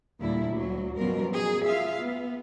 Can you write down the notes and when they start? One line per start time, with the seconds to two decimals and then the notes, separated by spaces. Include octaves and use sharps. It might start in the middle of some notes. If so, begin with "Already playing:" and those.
0.20 D#2 A#2 D3 G3 E4
0.50 D2 F#3
0.96 F#2 B2 F3 G3 A#4
1.32 B3 G#4
1.65 F4 E5 F5
2.01 B3